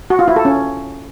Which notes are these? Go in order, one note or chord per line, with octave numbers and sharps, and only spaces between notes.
F#4
F4
E4
A4
C#4